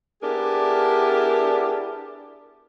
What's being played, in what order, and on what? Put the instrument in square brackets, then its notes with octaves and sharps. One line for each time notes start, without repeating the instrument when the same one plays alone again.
[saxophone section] B3 D4 E4 G4 G#4 A#4